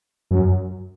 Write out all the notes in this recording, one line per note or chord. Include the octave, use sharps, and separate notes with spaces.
F#2